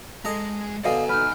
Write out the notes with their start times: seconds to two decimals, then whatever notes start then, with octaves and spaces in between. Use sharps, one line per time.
0.25 G#3 G#4 A4 D#5 A#5
0.84 B2 D3 D5 D#5 F5 F#5 G#5
1.09 D#4 B4 F6